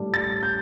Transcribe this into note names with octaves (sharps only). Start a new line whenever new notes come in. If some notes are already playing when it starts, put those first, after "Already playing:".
Already playing: A2 G3 D4
A6
G6